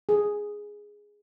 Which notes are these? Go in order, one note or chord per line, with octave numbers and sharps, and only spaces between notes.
G#4